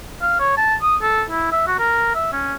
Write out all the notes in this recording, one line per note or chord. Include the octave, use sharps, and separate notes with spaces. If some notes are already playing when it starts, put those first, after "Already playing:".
F5
C#5
A5
D#6
A4
E4
E5
F#4
A#4
E5
C#4